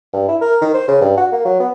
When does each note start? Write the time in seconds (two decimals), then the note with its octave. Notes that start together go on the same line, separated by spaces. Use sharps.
0.13 G2
0.28 E4
0.41 A#4
0.61 D#3
0.74 C5
0.88 C#3
1.01 G2
1.17 F#4
1.32 A#3
1.45 F#3
1.60 B3